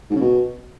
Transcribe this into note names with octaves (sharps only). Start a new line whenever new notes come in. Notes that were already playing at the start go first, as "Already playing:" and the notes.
G#2
C#3
B2